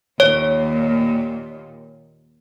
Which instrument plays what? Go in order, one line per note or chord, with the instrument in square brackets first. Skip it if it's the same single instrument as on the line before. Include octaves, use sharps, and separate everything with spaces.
[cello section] D#2 A#2 [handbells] C#5